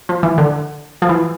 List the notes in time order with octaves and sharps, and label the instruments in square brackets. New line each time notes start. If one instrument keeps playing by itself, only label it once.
[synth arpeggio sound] F3
E3
D3
F3
E3